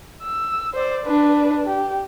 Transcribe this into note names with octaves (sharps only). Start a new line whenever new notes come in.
E6
C5 D5
D4 B4
G4